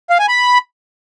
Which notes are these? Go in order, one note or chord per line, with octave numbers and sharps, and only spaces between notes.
F5
G#5
B5